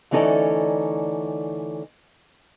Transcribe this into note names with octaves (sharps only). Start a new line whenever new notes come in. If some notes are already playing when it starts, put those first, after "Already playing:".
D2 E3 C#4 D#4 A4 D5